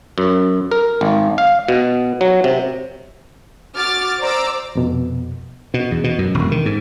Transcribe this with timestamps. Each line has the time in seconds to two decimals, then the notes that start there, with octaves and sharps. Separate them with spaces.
0.18 F#2
0.71 A#4
1.01 G#1
1.38 F5
1.68 B2
2.21 F#3
2.44 C3
3.75 F#4 D6 F6 A6
4.20 C5 D5 A#5 D6 E6
4.75 F2 B2
5.74 B2
5.91 E2
6.04 B2
6.18 F#2
6.34 E1
6.51 D#3
6.66 G#2